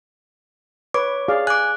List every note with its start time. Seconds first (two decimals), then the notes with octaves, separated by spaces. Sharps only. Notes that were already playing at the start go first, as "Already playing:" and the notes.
0.94 B4 C#5 D6
1.28 G#4 D5 F5
1.47 G#5 D6 F#6